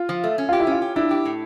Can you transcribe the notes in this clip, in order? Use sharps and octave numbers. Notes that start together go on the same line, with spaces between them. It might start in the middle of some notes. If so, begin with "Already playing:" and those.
Already playing: F4
F3
A3
C#4
F4 G4
E4
C#4
F4
G4
D4 E4
G4
A2